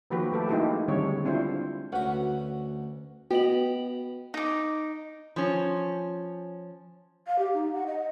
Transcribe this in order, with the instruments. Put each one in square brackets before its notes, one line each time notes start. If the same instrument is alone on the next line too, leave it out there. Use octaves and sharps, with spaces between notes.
[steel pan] D#3 F3 A#3 F#4 G4 B4
A3 G4 A4
G#3 A#3 D#4 E4 F#4 G4
D3 D#3 G3 G#3 C4 C#5
C4 D4 E4 F4 C5
[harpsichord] D2 F#4 [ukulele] C#4 B4 F#5
[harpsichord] B3 [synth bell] F#4 F#7 [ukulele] D#5 G5
[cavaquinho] D#4 D6
[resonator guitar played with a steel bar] F3 C#4
[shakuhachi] F5
G4
D#4
F#5
D#5